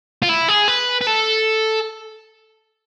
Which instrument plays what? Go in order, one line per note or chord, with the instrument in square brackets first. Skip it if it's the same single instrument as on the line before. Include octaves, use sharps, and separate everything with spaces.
[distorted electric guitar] F4
E4
G#4
B4
B4
A4